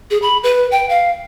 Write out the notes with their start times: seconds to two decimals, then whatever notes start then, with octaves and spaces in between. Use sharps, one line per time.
0.11 G#4
0.22 B5
0.43 B4
0.71 G5
0.89 F5